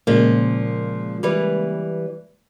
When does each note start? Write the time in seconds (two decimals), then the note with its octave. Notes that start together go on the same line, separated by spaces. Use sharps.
0.07 A#2 C#3 F3 G#3 A#3
1.23 E3 G3 B4